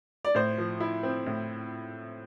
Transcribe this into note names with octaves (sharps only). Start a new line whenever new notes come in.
D5
A2 C5
F3
E4
C4
A2